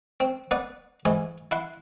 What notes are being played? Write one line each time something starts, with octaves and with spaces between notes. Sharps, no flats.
C4
B3 B4 D5 F#5
G#2 E3 G#5
E4 F#5 C6